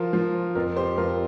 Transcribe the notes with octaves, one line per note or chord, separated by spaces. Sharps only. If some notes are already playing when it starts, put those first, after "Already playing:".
Already playing: F3 F4 A#4
F3 F4
F2 F4 A#4
G4 C5
F2 F4 A#4